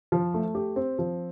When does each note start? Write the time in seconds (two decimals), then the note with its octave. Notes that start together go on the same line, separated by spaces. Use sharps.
0.12 F3
0.34 A3
0.55 G4
0.76 C4
0.99 F3